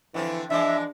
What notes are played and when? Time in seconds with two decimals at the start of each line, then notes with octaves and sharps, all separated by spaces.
0.14 D3 E3 F3 C4
0.50 E3 F3 G#3 D4 E5